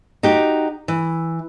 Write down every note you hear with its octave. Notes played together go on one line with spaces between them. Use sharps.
D#4 F#4 G4
E3